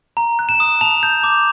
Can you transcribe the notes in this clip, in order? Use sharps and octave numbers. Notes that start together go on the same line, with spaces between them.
A#5
F#6
E7
D#6
A5 F7
G6
D6